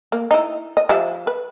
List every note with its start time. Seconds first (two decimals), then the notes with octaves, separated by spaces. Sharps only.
0.12 A#3
0.31 D#4 E4
0.77 D#5
0.89 F3 G4 E5
1.27 B4